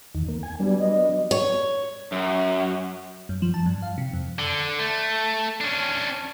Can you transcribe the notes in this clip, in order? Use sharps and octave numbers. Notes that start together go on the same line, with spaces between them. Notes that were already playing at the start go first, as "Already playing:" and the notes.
E2 D#3
A#3
G#5
F#3 G3 B3 D4
D#5
C#5
F#2
F#2
F3
A5
G2
F5
C3
F2
D3
A3
C#4 D4